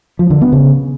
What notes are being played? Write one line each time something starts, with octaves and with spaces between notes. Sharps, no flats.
F3
D3
B3
C#3